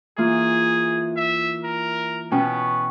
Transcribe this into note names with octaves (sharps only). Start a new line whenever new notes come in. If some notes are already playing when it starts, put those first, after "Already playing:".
E3 A#3 F4 G#4
E5
A#4
B2 B3 C#4 G5